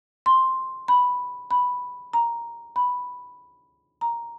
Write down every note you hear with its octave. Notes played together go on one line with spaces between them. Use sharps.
C6
B5
B5
A#5
B5
A#5